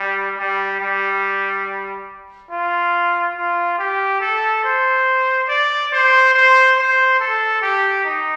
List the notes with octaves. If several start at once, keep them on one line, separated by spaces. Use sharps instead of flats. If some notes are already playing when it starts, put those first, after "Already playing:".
Already playing: G3
G3
G3
F4
F4
G4
A4
C5
D5
C5
C5
C5
A4
G4
D#4